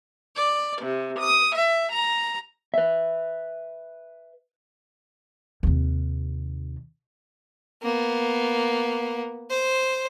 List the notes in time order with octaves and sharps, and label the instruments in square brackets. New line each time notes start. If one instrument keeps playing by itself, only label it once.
[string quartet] D5
C3
D#6
E5
A#5
[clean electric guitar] B4 E5
[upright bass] D#2 C3
[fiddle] A#3 B3
C5